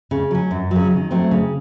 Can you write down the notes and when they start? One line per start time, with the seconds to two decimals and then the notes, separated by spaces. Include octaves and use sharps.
0.11 C#3
0.31 F#3 C#4
0.51 F#2
0.71 C#3 F#3
0.91 D#3
1.11 F#3 A3 C4
1.31 C#3